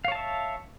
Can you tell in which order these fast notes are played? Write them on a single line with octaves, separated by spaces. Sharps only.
F5 C#5 A5 E5